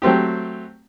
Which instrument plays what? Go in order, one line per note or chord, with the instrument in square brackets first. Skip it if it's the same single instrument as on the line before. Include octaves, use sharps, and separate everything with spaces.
[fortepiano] F#3 A3 C4 G4